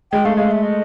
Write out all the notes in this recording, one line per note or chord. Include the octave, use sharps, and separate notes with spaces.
G#3 G5
A3 F5
G#3 F5
E5
D#5